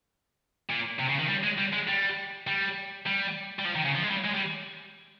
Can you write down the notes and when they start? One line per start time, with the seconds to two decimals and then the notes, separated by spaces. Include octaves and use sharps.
0.70 A#2
1.00 C3
1.09 C#3
1.19 D#3
1.29 G3
1.44 G#3
1.59 G3
1.73 G#3
1.88 G3
2.47 G3
3.07 G3
3.59 G3
3.65 F3
3.75 D#3
3.85 C#3
3.95 F3
4.02 G#3
4.10 G3
4.24 G#3
4.34 G3